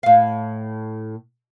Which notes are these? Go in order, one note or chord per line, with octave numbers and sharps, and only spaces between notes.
A2 F5